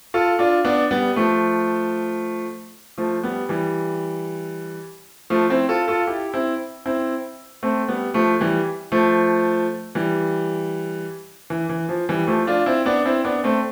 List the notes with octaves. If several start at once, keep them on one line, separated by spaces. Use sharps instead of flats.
F4 A4
D4 F4
B3 D4
G3 B3
F3 A3
F3 A3
G3 B3
E3 G3
F3 A3
C4 E4
F4 A4
F4 A4
E4 G4
C4 E4
C4 E4
A3 C4
G3 B3
F3 A3
E3 G3
F3 A3
E3 G3
E3
E3
F3
E3 G3
F3 A3
D4 F4
C4 E4
B3 D4
C4 E4
B3 D4
A3 C4